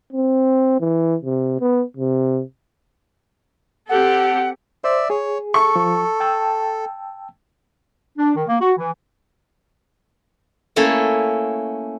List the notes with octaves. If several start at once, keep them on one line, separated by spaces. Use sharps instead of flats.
C4
E3
C3
B3
C3
C4 G4 A4 F#5
C5 D5 E5
G#4 C#5
A4 C#6
F3
G5 A5 E6
D4
D#3
A#3
F#4
E3
A3 A#3 C#4 E4 C#5